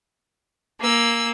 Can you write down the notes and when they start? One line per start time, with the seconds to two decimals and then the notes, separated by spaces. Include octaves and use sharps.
0.81 A#3 G#5 E6